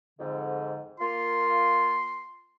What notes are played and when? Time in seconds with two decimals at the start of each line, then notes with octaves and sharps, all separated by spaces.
0.19 F2 G#2 D3
1.00 A#3 F4 C6